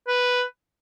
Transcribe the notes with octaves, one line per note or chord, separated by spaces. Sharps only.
B4